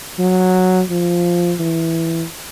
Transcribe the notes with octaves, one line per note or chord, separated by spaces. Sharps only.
F#3
F3
E3